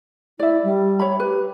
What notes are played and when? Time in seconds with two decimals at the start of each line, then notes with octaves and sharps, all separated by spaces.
0.39 E4 D5 E5
0.63 G3
0.99 C#5 E5 B5
1.20 G4 B4